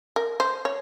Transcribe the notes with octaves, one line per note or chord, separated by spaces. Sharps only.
A#4
C5
C#5